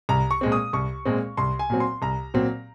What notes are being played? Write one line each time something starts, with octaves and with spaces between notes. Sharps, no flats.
C2 A#5
C#6
A#2 G#3 C4
D#6
C2 C#6
A#2 G#3 C4
C2 C6
G#5
A#2 F#3 C4
C6
C2 A#5
A#2 F#3 C4